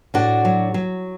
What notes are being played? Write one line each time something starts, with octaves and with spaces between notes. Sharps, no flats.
A2 D4 F#4
F#3
F#3